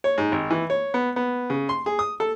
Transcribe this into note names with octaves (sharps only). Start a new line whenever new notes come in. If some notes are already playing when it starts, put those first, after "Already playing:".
C#5
G#2
G#1
E3
C#5
B3
B3
C#3
C6
G#4
D#6
A4